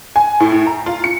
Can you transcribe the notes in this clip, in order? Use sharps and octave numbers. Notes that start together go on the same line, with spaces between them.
G#5
A2
A2
A#5
F4
C#7